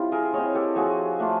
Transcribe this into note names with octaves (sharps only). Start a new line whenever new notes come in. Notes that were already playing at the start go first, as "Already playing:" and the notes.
Already playing: G3 C4 E4 F4
G#4 A#4
C4 E4 C#5 D#5
G4 A4
F3 F#4 G#4
A3 D4 F4